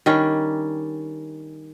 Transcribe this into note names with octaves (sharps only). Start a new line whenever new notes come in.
D#3 G3 C#4 D4